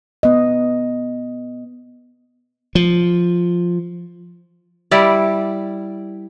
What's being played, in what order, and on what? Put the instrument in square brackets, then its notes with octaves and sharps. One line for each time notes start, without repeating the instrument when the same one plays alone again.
[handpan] B3 D#5
[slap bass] F3
[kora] G3 E4 D5